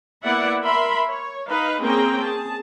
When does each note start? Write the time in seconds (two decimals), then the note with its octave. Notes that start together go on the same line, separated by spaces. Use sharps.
0.22 A#3 B3 E4 D5 E5 F#5
0.61 A#4 E5 B5 C6
1.07 C#5
1.48 D#4 B4 F5
1.80 A#3 C4 C#4 G#4 G5 A#5
2.20 G#4 A5